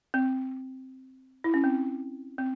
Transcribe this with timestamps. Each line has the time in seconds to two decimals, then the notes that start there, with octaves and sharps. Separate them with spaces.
0.14 C4
1.44 E4
1.54 C#4
1.64 C4
2.38 C4